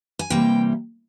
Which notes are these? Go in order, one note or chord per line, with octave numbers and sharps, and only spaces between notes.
G#5
C3 E3 G3 A#3 G5